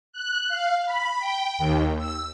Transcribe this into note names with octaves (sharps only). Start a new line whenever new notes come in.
F#6
F5
B5
G5
D#2
E6